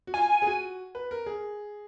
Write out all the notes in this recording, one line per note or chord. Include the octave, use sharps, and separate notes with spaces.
F#4
F4 G#5
G#4
F#4
B4
A#4
G#4